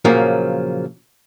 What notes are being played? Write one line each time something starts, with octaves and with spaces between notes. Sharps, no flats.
A#2 C#3 F3 F#3 A#3